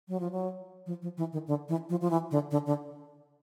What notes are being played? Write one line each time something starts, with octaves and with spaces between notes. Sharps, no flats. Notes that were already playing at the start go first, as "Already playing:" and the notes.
F#3
F3
F#3
F3
F3
E3
D#3
D3
E3
F3
F3
E3
D3
D3
D3